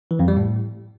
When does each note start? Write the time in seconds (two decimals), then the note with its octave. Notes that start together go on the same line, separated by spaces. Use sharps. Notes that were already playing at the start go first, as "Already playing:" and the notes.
0.11 E3
0.19 F2
0.28 G3
0.37 A2